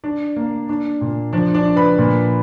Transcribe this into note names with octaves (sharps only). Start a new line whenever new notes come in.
D4 D5
A#3
D4
A#2
F3 D4 D5
D4 D5
D4
B4 B5
A#2